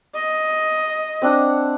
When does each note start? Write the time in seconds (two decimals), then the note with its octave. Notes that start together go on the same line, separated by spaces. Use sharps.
0.15 D#5
1.22 C4 D4 F#5